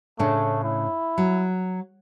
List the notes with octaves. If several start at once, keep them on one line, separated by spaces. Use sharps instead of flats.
A2 C#3 A3 D4
E4
F#3